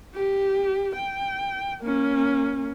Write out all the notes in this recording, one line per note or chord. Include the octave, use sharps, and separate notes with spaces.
G4
G5
A#3 C#4